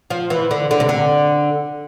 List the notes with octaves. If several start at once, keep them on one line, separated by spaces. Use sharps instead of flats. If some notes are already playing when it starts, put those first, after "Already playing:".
F3
E3
D3
D3
C3
D3